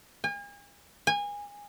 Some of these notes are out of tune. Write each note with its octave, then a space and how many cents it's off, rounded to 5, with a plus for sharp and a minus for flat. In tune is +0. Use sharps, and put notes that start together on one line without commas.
G#5 -40
G#5 -25